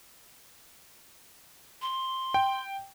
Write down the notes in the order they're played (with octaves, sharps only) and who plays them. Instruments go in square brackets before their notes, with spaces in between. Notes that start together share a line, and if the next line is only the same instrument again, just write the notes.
[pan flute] C6
[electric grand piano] G5